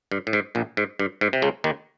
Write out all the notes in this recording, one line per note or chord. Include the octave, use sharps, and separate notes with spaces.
G2
A2
G#2
A#1 A#2
G#2
G2
G#2
C3
C#2 C#3
D#2 D#3